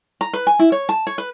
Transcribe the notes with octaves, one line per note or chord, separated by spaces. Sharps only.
A#5
B4
G#5
E4
C#5
A5
C#5
B4